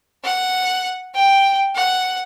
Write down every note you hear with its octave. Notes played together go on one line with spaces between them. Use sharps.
F#5
G5
F#5